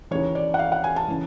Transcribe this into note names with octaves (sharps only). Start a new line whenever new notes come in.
D#2 C#3 E3 C#5
D5
F#5
F5
F#5
G#5
A5
C#3 E3